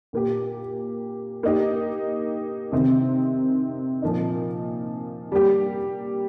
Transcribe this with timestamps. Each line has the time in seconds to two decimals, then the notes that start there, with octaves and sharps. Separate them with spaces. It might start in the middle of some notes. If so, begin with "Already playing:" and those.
0.13 A#2 A#3 G4
1.43 A#3 D#4 G4
2.72 C3 D#3 C4
4.02 A#2 F3 A#3 D#4
5.32 G3 A#3 G4